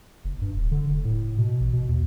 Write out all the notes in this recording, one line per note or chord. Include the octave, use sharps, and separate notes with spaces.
F#1
G2
D#1
D3
F1
A2
B2
A1
B2
D#2